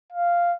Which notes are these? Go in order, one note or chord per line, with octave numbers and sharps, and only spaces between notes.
F5